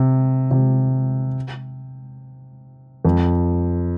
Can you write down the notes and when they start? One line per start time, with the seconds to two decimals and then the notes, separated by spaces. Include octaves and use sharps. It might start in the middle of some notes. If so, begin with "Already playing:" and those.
Already playing: C3
0.51 C3
3.05 F2